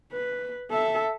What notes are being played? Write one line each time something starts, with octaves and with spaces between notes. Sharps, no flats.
B4
A4 E5